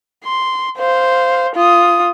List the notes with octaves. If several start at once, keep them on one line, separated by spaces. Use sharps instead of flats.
C6
C5 F5
F4 D#6